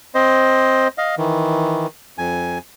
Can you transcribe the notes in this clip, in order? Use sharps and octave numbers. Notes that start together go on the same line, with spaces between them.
C4 C5 D#5
D#5 F5
D#3 E3
F2 G#5